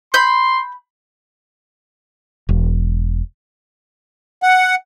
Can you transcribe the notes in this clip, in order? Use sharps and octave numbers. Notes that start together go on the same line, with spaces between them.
B5 C6 G6
E1
F#5